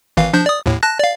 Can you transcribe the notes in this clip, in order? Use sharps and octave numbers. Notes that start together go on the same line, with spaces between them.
G#1 E3 F5
F3 D4 G6
D5 D#6
D#2 A2
A5 F#6 A#6
D5 F5